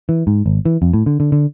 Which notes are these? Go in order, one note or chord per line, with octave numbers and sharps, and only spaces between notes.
E3
G#2
G#1
E3
F2
A2
D3
D3
D3